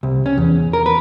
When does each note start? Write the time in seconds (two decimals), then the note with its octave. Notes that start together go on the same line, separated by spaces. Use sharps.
0.03 C2
0.26 C#4
0.38 E2
0.73 A#4
0.86 B4